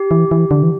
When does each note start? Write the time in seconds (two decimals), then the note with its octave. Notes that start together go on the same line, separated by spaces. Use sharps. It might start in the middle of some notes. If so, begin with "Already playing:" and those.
Already playing: G4
0.11 E3
0.31 E3
0.51 D3
0.63 E3